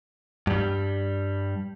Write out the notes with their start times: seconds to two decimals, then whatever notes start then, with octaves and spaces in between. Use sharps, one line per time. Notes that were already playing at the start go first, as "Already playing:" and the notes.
0.47 G2 G3